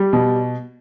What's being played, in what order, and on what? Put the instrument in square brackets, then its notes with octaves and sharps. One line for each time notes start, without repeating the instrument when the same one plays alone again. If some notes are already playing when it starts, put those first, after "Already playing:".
Already playing: [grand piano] G3
B2